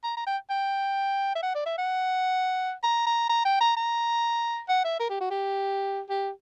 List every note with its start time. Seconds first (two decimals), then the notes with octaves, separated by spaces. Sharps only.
0.04 A#5
0.17 A#5
0.27 G5
0.50 G5
1.35 E5
1.43 F#5
1.55 D5
1.66 E5
1.78 F#5
2.83 A#5
3.07 A#5
3.29 A#5
3.45 G5
3.61 A#5
3.77 A#5
4.69 F#5
4.85 E5
5.00 A#4
5.10 G4
5.21 F#4
5.31 G4
6.09 G4